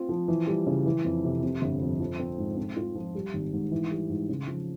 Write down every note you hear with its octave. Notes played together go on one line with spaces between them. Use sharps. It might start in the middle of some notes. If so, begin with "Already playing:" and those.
Already playing: C4 F4
F3
E3
G3
C#3
E3
F2
C3
C3
G1
F2
F3
C4
G#2
C4
F4
F3
G3
G#1
G#2
E3
G3
G#2
C#3
F3